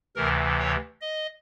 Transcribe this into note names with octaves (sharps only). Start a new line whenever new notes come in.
D2 C3 E3 A#4
C#5
D#5